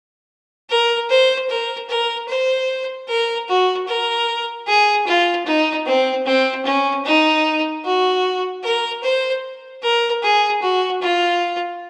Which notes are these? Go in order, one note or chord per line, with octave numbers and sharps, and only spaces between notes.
A#4
C5
A#4
A#4
C5
A#4
F#4
A#4
G#4
F4
D#4
C4
C4
C#4
D#4
F#4
A#4
C5
A#4
G#4
F#4
F4